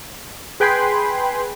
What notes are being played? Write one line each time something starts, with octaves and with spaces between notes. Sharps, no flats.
G#4 B4 G5 G#5 B5 C6